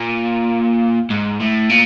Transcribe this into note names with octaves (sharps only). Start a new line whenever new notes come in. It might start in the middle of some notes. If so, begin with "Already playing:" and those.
Already playing: A#2
G#2
A2
A#2